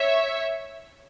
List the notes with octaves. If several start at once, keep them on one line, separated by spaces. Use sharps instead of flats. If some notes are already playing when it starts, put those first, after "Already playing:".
Already playing: C#5 E5